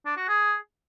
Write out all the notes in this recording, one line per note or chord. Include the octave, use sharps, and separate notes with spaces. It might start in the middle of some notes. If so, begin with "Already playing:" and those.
D4
F#4
G#4